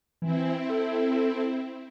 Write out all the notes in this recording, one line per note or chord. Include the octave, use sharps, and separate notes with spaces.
E3 C4 E4
A4